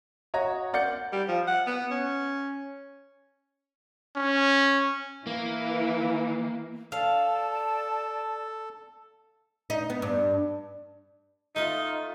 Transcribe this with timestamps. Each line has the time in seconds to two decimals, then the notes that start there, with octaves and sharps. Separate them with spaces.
0.34 F#4 C#5 D#5 A#5
0.73 A#4 D5 F#5 G6 C#7
1.12 G3
1.28 F3
1.47 F#5
1.67 B3
1.91 C#4
4.16 C#4
5.27 E3 A#3
6.92 A4 D5 F5 A5
9.70 D#4
9.90 B3
10.02 G2
11.56 A3 D#4 F4